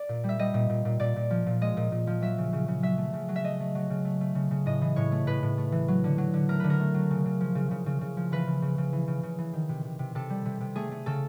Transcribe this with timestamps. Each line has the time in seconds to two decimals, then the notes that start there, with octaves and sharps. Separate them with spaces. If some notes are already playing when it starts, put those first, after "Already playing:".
Already playing: D5
0.09 A#2
0.24 G3
0.29 E5
0.39 G3 D#5
0.54 A#2
0.70 A#2
0.85 A#2
1.00 A#2 D5
1.16 A#2
1.31 F3
1.47 A#2
1.61 G#3 D#5
1.77 A#2
1.92 A#2
2.07 F3
2.22 F#3 E5
2.38 C#3
2.53 C#3
2.68 C#3
2.82 F#3 E5
2.98 A3
3.13 C#3
3.29 F#3
3.36 E5
3.44 A3 D#5
3.60 A3
3.75 F#3
3.90 C#3
4.05 A3
4.21 A3
4.35 C#3
4.51 C#3
4.66 A2 D#5
4.81 E3
4.96 A2 C#5
5.12 A3
5.27 A2 B4
5.43 A2
5.58 A3
5.72 E3
5.88 F#3
6.04 D3
6.18 F#3
6.34 D3
6.49 A3 A#4
6.60 D3 B4
6.70 A#4
6.80 A3
6.94 F#3
7.10 C#3
7.26 C#3
7.41 F3
7.55 C#3
7.71 C#3
7.86 C#3
8.01 C#3
8.17 F3
8.32 E3 B4
8.47 C#3
8.62 C#3
8.78 C#3
8.93 E3
9.08 C#3
9.23 C#3
9.38 E3
9.53 D#3
9.69 C3
9.85 C3
9.99 C3
10.15 C3 A4
10.30 G3
10.45 C3
10.61 C3
10.75 A3 G#4
10.91 A3
11.06 C#3 A4